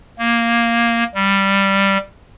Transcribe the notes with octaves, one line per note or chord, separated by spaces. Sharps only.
A#3
G3